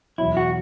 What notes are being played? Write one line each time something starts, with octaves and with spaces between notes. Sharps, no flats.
E2 B2 F#3 E4
F#4